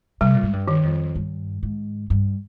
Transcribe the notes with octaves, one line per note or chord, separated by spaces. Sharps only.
C3 G3
A#2
G#2
G2
D#3
F2
G2
G#2
G2